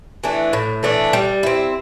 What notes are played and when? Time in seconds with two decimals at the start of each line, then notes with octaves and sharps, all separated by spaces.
0.24 E3 A3 D4
0.53 A2
0.83 E3 A3 D4
1.13 G3
1.43 C4 E4